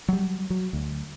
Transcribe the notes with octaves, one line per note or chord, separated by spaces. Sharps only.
F#3 G3
F#3
D2